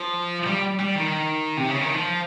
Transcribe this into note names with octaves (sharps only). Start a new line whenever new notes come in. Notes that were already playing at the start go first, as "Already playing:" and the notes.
Already playing: F3
G3
G3
D#3
C3
C#3
D#3
F3